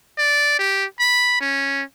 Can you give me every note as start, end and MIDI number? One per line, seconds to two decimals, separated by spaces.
0.18 0.57 74
0.59 0.85 67
1.00 1.37 83
1.41 1.82 61